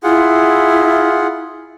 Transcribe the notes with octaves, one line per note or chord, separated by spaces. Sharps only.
E4 F4 G#4 F#5